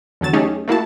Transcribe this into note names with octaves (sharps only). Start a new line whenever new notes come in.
E2 D3 F#3 A6 E7
A3 C#4 D#4 G4 G#4
A3 A#3 E4 F#4 A5